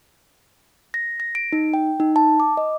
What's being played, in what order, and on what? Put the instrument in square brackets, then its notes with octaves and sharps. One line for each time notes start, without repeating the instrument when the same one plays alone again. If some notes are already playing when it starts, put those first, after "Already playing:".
[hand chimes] A#6
A#6
D7
D#4
G5
D#4
A5
D6
D#5